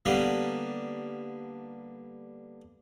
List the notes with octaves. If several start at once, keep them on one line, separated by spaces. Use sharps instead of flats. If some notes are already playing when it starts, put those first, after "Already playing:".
D3 G3 A#3 B3 D4